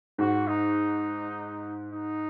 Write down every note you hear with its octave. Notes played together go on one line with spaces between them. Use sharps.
G#2 F#4
D#4
D#4